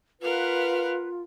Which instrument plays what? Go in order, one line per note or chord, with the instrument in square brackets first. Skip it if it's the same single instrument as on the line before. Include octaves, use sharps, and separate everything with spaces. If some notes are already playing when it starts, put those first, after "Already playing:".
[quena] F4 [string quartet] A#4 F5 F#5 [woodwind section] B4